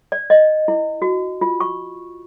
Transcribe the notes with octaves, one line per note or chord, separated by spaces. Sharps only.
D5
D#5
E4
F#4
F4
C#6